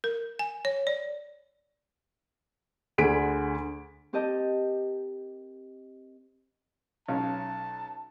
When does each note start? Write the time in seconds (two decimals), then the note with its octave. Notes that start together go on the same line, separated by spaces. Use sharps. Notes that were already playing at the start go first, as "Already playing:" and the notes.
0.04 A#4
0.39 G#5
0.65 C#5
0.87 D5
2.98 D2 D3 G#4 B6 D7
4.13 C4 G4 A#4 D#5 A5 G6
7.08 B1 C#4 F5 A5